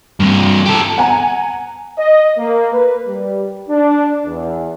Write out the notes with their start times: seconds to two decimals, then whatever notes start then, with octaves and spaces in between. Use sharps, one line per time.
0.20 G2 C3
0.66 G4 A4
0.98 F#5 G#5 A#5
1.98 D#5
2.38 A#3
2.73 B4
3.07 G3
3.69 D4
4.26 E2